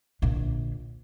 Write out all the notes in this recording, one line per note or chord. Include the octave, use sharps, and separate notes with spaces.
A#1 D3